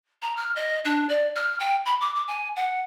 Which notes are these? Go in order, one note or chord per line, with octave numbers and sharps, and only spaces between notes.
A#5
F6
D#5
D4
D5
F6
G5
B5
D6
D6
G#5
F#5